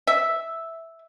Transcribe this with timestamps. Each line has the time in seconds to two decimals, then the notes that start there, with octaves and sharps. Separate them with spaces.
0.07 E5